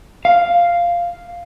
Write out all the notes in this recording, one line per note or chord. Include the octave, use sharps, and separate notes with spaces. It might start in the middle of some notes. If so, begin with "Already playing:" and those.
F5